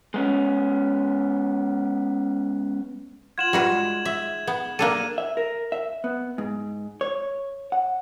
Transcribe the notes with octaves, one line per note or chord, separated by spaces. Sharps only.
G#3 B3 C#4
F4 F#5 G#6 E7 F#7
G#2 G3 F#4 B4
E5
B3
A#3 D4 A4 D#7
E5
A#4
E5
B3
G#2
C#5
F#5